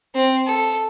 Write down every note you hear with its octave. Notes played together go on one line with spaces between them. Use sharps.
C4
A4